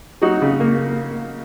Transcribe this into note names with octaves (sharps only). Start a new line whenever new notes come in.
F#3 D#4 F#4
C#3
A#3